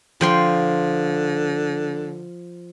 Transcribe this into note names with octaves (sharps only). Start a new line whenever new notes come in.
D3 F3 G5 C6